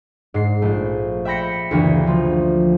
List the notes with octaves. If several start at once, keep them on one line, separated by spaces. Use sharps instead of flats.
G#2 C7
A#1 A3
E5 G5 B5 A#6 C#7
F#1 D2 E3 A#3 F#4
F3